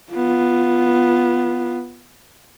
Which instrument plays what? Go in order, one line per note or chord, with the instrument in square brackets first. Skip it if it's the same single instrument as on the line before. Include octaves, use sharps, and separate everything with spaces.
[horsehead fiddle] B3 F4